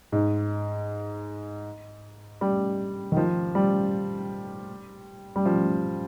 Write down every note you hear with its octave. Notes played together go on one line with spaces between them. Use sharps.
G#2
G3
D#3
F3
G3
G3
F3